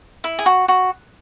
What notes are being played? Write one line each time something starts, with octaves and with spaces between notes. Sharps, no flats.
E4
G#4
F#4
F#4